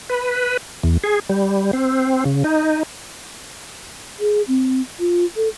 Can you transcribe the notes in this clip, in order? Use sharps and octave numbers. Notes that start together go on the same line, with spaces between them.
B4
E2
G#4
G3
C4
C#3
D#4
G#4
C4
F4
A4